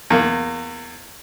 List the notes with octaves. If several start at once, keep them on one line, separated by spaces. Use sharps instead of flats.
E2 A#3